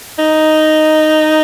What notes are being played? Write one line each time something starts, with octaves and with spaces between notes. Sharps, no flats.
D#4